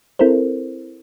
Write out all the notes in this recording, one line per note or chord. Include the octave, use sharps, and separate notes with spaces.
C4 E4 A4 A#4 C5